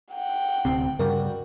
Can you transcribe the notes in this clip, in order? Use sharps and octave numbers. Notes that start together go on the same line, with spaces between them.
F#5 G5
D1 D2 C3 C4
G2 C#3 G3 F#4 A#4 D5 G5